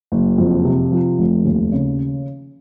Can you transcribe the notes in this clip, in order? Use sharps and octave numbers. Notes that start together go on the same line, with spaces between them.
F#1
F2
C3
F3
F1
D#2
C#3